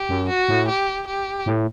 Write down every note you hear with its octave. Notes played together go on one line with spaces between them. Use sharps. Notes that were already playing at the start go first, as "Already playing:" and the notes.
Already playing: G4
F#2
F#4
A2
G4
G4
A2